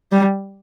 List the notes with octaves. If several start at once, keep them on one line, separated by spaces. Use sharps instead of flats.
G3